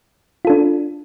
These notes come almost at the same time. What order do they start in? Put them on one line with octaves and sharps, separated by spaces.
F4 A4 D4